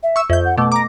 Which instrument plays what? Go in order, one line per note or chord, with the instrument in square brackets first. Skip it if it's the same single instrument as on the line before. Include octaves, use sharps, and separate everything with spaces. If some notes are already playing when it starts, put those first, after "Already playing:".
[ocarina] E5
[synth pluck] C#6 E6
[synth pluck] F2 G6 [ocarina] E5
[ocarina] F#5
[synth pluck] B2 A3 [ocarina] D6
[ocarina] A#5 [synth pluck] D6 A#6